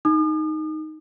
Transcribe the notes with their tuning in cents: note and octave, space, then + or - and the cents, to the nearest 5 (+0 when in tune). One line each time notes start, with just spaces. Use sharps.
D#4 +0 D#6 -45